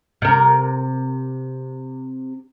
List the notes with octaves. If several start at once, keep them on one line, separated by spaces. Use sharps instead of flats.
C3 A#4